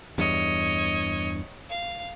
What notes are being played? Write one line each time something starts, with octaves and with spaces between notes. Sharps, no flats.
E2 G2 C#5 D#5
F5